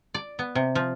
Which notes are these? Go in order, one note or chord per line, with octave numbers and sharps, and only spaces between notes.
D5
B3
C3
F3